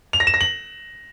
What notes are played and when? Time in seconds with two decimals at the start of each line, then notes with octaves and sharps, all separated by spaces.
0.13 F7
0.20 A#6
0.27 E7
0.34 A#6
0.41 F#7